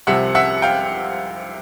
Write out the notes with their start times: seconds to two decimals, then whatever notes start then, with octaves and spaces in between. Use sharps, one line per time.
0.07 C2 C3 F3 E5 F#5
0.35 E5 F#5
0.62 F5 G5